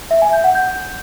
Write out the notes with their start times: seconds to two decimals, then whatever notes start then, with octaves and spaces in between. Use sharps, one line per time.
0.11 E5
0.22 G#5
0.33 G6
0.44 F#5
0.55 G6